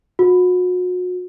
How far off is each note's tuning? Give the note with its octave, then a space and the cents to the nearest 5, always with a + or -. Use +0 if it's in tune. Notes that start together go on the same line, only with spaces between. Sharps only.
F#4 -35